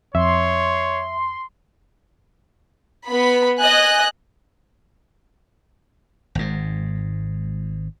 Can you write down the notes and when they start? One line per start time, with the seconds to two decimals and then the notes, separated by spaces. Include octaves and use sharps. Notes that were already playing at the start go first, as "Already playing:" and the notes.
0.15 F2 C#5 E5 C6
3.09 B3 B5
3.59 D#5 G#5 F#6
6.35 G#1 G#2